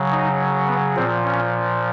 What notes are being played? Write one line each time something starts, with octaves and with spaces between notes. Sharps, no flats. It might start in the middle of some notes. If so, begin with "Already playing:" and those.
Already playing: C#3 F#3
D#4
B3
A#2 F3 C4
C#4